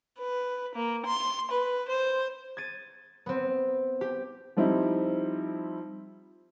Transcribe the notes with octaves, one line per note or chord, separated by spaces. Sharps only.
B4
A#3
C6
B4
C5
G#6 A6 D#7
B3 C4
G4
F3 G3 C4 D#4 E4